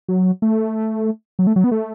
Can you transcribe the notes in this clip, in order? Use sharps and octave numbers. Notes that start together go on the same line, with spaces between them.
F#3
A3
F#3
A3
F#3
B3
A3